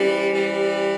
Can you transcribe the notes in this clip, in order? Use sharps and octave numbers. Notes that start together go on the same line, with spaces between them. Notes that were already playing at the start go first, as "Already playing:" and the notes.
Already playing: E3 G3 C#4 G4 C5
E3 G3